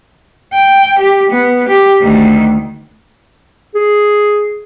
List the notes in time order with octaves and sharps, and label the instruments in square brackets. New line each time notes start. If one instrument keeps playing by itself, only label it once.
[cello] G5
G4
B3
G4
D2 D#3
[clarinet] G#4